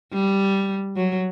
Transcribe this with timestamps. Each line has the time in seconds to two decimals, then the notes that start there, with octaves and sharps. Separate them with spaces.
0.13 G3
0.96 F#3